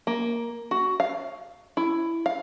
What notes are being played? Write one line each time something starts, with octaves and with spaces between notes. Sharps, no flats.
A#3
F#4
F5
E4
F5